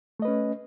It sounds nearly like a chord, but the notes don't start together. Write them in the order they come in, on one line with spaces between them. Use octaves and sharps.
A3 D#5 B4 C#4